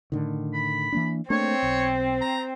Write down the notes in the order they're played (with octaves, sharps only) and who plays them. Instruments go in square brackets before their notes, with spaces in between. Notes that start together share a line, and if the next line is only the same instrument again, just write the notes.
[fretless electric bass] A2 D3 D#3
[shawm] B5
[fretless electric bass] E3 A#3 D4
[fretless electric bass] A3 A#3 D4 [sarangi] C4 [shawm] C#5
[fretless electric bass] B1
[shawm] A#5